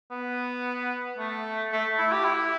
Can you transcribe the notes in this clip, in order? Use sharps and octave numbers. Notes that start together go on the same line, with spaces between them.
B3
A3
A3
E4
G4
E4